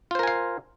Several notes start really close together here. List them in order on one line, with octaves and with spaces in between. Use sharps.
F4 C5 A#4 G#5 F5